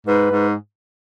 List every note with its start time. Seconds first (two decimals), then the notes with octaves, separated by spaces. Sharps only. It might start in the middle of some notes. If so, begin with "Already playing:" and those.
0.07 G#2 B4
0.31 G#2